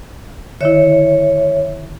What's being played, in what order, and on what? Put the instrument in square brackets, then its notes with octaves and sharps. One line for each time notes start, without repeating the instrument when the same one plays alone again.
[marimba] D3 D#3 E4 [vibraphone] C#5 E5